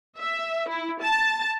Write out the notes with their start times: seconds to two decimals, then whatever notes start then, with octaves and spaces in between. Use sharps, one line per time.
0.19 E5
0.68 E4
1.01 A5